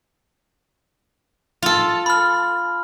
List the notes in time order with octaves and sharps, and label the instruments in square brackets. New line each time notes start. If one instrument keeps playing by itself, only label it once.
[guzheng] F4 A4
[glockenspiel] B5 F6